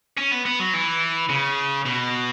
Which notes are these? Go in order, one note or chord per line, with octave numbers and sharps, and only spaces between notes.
C#4
B3
B3
F#3
E3
C#3
B2